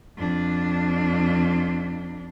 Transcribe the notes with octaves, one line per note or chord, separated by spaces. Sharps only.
F2 D4